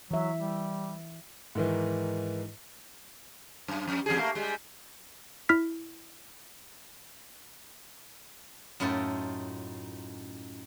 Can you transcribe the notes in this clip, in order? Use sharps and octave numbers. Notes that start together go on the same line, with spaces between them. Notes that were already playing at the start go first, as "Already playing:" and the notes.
E3 F#3 E5
G3
G#2 D#3 E3
F#2
F2 G3
E2 G3 G#4
A3 A#3
G3 G#3
E4 F6 B6
F#2 A2 D#4 F4 E5 A5